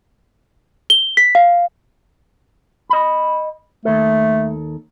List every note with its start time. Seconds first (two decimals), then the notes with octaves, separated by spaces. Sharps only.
0.90 G7
1.17 B6
1.35 F5
2.90 D#5 B5
3.85 D#2 A3 A4